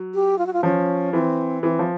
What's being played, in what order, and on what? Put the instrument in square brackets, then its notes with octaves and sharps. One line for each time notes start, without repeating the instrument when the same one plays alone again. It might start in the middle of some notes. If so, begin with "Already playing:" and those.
Already playing: [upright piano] F#3
[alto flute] G4
F4
F#4
F4
[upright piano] F3 [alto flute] C#4
[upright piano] E3 [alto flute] C4
[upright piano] E3 [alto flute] C4
[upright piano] F3